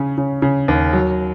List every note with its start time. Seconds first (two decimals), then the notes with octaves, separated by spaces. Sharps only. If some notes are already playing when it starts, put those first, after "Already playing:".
Already playing: C#3 C#4
0.18 C#3
0.42 C#3
0.68 D#2
0.93 F#3